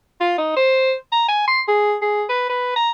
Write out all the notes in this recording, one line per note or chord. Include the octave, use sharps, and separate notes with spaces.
F4
D#4
C5
A#5
G#5
C6
G#4
G#4
B4
B4
A#5